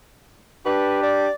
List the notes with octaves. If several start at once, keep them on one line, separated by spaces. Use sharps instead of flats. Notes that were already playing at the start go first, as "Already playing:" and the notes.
D4 G4 B4
D5